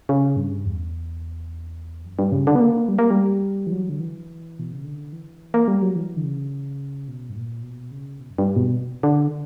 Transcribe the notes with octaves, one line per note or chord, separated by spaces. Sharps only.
C#3
G2
E2
F#2
G2
C#3
D3
B3
A#3
G3
A#3
G3
E3
F#3
D3
E3
B2
C#3
D3
E3
A#3
G3
F#3
E3
D3
C#3
B2
G2
A#2
B2
C#3
B2
F#2
G2
B2
D3